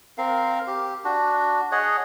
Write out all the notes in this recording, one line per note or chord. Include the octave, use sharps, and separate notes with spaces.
C4 A#4 F5
G4
D4 F#4
G#4 C#5 D#5 F#5